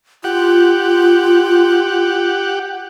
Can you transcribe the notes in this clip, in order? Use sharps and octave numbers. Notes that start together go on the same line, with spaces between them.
F4 G4 F#5